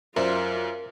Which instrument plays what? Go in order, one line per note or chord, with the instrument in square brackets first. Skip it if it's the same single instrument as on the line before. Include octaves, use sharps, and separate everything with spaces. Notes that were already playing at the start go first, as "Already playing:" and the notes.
[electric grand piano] F#2 [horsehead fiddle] F4 [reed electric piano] A#4 [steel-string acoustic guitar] C5 D5 E5